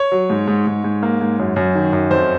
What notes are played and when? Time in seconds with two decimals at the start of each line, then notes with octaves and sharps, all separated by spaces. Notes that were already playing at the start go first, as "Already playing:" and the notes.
Already playing: C#5
0.12 F#3
0.30 G#2
0.47 G#2
0.67 G#2
0.84 G#2
1.03 A#3
1.21 G#2
1.39 F#2
1.56 F#2
1.75 D#3
1.93 F#2
2.11 F2 C5